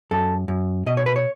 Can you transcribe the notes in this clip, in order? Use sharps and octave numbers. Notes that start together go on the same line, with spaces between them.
F#2 A4
F#2
B2 D#5
C#5
B4
C#5